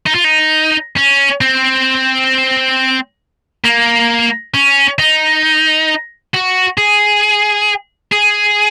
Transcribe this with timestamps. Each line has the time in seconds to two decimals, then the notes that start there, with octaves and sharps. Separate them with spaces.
0.06 D#4
0.15 F4
0.24 D#4
0.96 C#4
1.41 C4
3.64 A#3
4.54 C#4
4.99 D#4
6.34 F#4
6.78 G#4
8.12 G#4